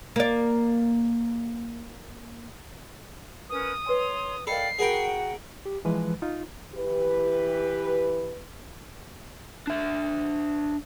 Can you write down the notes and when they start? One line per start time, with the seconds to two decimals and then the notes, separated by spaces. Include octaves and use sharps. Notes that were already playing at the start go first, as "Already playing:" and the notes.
0.16 A#3 D5
3.50 C#4 A#4 B4 D#6
3.86 B4 C#5 G#5 C6
4.47 A4 A#4 D5 D#5 F5 G5 B5 C7
4.79 F#4 G#4 A#4 C#5 F#5 G5 B5
5.66 G4
5.85 E3 F3 G#3 B4
6.22 D#4 F4
6.75 E3 G4 B4
9.67 D4 E5